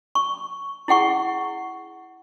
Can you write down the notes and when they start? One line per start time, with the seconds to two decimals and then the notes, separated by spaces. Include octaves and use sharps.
0.15 C#6
0.88 E4 G#4 F#5 C#6